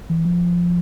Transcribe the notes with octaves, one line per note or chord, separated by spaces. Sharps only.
E3
F3